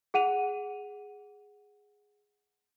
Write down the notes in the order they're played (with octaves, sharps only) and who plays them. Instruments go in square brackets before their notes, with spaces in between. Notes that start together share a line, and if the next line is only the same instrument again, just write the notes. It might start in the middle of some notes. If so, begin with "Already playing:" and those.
[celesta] G#4 F#5 D#7 F7